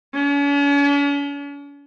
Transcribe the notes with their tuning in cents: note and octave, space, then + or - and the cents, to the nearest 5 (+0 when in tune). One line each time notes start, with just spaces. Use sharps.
C#4 +45